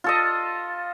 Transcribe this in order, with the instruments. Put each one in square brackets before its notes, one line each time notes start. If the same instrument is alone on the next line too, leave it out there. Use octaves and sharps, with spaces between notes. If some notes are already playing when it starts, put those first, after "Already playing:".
[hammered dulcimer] F4 A4 D#5